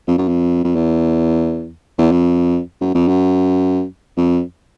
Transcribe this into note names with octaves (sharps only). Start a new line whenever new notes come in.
F2
F#2
F2
F2
E2
E2
F2
F#2
F2
F#2
F2